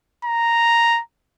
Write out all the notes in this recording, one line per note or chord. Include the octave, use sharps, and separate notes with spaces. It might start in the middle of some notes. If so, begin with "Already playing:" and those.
A#5